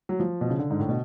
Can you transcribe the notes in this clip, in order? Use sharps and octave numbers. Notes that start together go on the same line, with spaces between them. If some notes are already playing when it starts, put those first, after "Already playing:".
F#3
F3
B2
C#3
D3
G#2
A2
B2